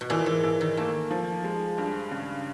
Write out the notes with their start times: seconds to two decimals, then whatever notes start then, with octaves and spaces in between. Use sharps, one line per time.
0.01 B2
0.10 A#2 E3
0.26 G#2
0.44 E3
0.61 D#3
0.77 A3 A#3
1.11 F3
1.44 G#3
1.78 G2
2.11 C#3